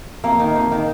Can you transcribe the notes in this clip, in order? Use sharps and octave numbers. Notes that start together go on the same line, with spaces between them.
F2 A#3
D#3
F2
D#3